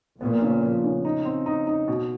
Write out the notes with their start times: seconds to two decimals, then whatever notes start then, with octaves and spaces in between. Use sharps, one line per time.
0.21 A#1 A#2 B3
0.42 C#3
0.63 F3
0.84 C#3
1.05 D#4
1.25 C4
1.46 D#4
1.67 D#4
1.88 B2